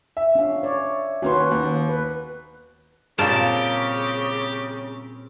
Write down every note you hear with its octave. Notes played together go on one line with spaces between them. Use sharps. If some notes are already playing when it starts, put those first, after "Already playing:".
E5
C#4 D4 F5
C#5 D5
D#2 C#4 F#4 B4 C6
D#2
B4
A#2 C#3 G3 C4 G4 A#4 A5